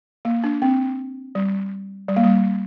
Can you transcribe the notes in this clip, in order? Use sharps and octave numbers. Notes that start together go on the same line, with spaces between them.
A#3
D4
C4
G3
G3
A#3
G3